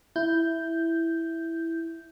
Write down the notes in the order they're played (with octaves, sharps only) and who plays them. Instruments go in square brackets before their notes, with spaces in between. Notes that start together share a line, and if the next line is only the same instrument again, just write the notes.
[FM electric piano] E4 G6